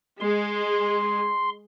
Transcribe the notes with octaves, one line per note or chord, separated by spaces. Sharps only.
G#3 G#4 C6